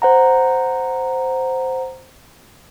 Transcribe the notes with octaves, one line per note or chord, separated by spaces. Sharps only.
C5 F#5 A#5